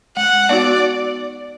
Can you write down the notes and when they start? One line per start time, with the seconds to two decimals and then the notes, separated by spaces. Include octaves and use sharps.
0.17 G#3 F#5
0.49 B3 D#4 F#4 D5